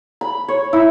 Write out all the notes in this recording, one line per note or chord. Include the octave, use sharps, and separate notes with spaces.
B5
C#5
E4